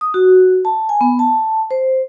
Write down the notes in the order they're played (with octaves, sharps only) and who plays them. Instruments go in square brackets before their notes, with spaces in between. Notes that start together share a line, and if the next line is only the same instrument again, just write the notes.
[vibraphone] D#6
F#4
A5
G#5
B3
A5
C5